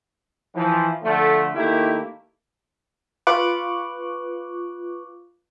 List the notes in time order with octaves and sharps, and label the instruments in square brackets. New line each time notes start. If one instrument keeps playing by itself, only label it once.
[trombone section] E3 F3
D3 F3 A3
D#3 A3 A#3 E4 G4
[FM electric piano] F4 B4 C#6 D6 F#6